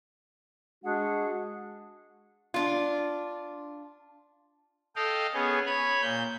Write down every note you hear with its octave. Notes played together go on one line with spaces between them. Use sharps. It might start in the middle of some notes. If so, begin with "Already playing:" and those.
G#3 D4 F#4 G#4 F#5
D4 F4
A4 D#5 F5 G5
B3 C#4 G#4
C#5 B5
A#2 G6